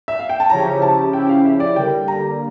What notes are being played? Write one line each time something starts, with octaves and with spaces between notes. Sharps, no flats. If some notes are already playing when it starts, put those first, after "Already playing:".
E5
F5
G5
A5
C#3 F3 C#4 E4 G4 A#5
A5
C#3 F3 C#4 E4 G4 G5
F5
E5
D5
D3 G3 A#3 G5
A#5